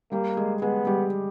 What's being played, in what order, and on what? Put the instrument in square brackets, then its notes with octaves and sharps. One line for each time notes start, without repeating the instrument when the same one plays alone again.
[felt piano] G3 G4 [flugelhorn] A#3
[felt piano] G#3 G#4
[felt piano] G#3 G#4 [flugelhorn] B3
[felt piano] G3 G4